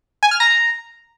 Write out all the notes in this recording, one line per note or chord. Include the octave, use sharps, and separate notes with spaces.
G#5
F6
A#5